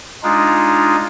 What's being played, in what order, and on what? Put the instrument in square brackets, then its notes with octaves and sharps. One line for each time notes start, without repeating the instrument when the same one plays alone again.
[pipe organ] G#3 D4 D#4 F4